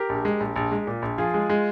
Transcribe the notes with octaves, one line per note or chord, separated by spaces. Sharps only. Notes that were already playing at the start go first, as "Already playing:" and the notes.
Already playing: G4 A#4
A#1
G#3
A#1
A#1
G#3
A#2
A#1
F3 F4 G#4
G#3
G#3